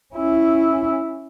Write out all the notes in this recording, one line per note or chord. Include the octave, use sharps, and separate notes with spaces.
C#4 E4